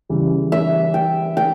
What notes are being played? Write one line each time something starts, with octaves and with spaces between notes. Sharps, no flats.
C#3 E3 G3
E5
G5
G5